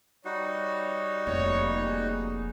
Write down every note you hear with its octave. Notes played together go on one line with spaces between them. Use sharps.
G3 D#4 F#4 C#5
F1 A#3 C#5
G#4